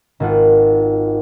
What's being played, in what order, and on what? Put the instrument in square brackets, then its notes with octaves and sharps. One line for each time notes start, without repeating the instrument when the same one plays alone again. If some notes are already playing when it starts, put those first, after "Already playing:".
[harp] G#1 F4 F#5